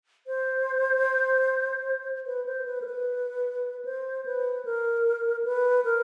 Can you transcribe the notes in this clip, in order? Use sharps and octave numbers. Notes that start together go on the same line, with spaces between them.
C5
B4
C5
B4
A#4
B4
C5
B4
A#4
B4
A#4